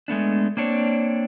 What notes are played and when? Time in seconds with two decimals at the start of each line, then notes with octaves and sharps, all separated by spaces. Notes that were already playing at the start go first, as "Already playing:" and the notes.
0.08 G#3 A3 B3 D4
0.57 A#3 C4 D4 C#5